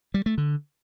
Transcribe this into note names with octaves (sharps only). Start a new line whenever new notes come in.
G3
A3
D3